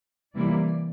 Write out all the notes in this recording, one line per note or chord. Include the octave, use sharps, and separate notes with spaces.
C3 E3 G3 A#3 E4 D5